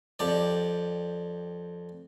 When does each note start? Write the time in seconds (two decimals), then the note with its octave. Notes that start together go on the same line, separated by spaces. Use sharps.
0.19 F2 G4 D5